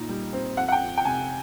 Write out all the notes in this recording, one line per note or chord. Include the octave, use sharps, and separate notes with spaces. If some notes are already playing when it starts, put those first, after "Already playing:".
Already playing: A#2 D#4
G3
C4
F2 F#5
F#5
G5
F2
G5
C3 G#5